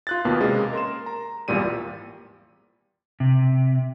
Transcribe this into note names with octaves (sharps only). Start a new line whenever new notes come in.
F4 F#6 A6
D#2 B2 A#3 B3
C3 G#3 A#3 C#4
A#4 C6 E7
A#5
G#1 E2 A#2 G3 D#7
C3